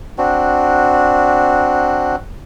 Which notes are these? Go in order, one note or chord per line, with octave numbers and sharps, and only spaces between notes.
C4 D4 F#4